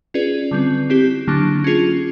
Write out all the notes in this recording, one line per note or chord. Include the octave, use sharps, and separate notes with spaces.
C#4 F4 G#4 B4 D5
D3 G3 C4
C4 E4 G4
D3 F#3 A#3 D4
C#4 F4 G#4